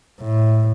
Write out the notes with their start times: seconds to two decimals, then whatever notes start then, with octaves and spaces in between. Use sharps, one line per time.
0.22 A2